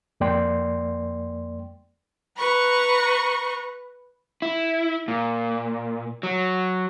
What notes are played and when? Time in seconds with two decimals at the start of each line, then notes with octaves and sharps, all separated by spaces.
0.20 F2 A#3 D5 G5 C6
2.35 B4 A#5 C#6
4.42 E4
5.08 A#2
6.23 F#3